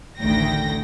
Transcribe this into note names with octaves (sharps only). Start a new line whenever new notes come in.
A1 D2 D#3 G5 A#6